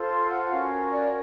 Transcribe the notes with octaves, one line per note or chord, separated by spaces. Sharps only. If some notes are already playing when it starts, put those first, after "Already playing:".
Already playing: F4 A4 C5
C6
F#5
F#5
C#4 F#4 A#4 C#5 F5
D5